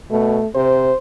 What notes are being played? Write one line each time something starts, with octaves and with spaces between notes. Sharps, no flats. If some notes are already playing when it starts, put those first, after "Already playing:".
B2 A3
C3 C5